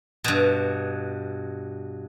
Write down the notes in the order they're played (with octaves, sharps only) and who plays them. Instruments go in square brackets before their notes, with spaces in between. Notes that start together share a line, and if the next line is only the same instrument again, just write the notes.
[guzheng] G2 B2